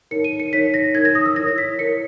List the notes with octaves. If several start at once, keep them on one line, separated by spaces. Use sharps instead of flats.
D#4 A#4 C#5 C#7
D#7
C#7
D#4 A#4 C#5 B6
A#6
D#4 A#4 C#5 G#6
A#6
D#6
E6
E4 A#4 C#5 A#6
A#6
B6
E4 A#4 C#5 C#7